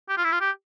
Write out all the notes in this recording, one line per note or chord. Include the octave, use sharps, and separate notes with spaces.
G4
F4
E4
F4
G4